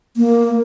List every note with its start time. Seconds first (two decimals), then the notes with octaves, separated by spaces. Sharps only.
0.17 A#3